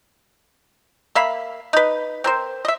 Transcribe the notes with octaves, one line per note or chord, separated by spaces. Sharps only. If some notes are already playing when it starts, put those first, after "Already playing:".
A#3 E5 F5 B5
D#4 B4
C4 A#4 C5
D#5 E5